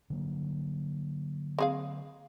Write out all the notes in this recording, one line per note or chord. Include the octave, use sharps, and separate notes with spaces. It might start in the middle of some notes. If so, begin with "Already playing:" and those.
D3 F#3 A#3
C4 G#4 F5